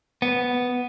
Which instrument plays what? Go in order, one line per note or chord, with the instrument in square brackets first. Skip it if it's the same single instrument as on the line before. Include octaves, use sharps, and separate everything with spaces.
[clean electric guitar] B3